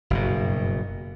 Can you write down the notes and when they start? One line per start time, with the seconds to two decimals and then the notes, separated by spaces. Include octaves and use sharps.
0.10 F#1 G2 B2